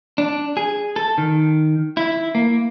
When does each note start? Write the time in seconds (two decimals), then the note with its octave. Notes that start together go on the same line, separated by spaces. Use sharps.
0.18 D4
0.57 G#4
0.96 A4
1.18 D#3
1.97 E4
2.35 A#3